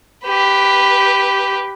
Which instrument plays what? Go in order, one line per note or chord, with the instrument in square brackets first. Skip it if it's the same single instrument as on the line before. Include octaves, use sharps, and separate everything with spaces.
[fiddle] G4 B4